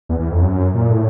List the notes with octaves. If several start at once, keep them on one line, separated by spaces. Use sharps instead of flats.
E2
E2
F2
F#2
A#2
A2